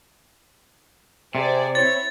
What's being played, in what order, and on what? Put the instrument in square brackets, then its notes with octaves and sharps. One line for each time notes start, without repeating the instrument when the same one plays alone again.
[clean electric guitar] C3 [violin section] G#4 C5 D5
[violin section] C4 E4 C#5 [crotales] A6